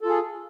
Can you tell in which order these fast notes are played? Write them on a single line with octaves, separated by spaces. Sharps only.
A4 F4 G#4